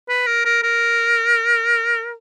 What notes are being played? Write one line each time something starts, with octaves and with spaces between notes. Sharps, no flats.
B4
A#4
A#4
A#4